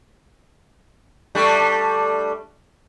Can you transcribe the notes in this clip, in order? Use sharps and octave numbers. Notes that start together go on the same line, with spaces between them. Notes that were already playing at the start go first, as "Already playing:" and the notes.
G3 A3 D4